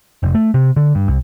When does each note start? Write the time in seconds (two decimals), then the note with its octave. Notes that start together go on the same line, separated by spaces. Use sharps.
0.23 F1
0.34 A3
0.54 C3
0.76 D3
0.95 G2
1.08 C2